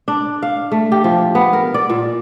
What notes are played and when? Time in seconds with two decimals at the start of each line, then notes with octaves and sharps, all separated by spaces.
0.08 D4
0.43 F5
0.72 A3
0.92 G4
1.04 F3
1.35 B3
1.53 A#4
1.74 D5
1.90 A#2